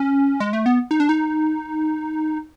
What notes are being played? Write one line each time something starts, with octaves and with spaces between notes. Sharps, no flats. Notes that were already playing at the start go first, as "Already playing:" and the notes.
Already playing: C#4
G#3
A3
B3
D#4
D4
D#4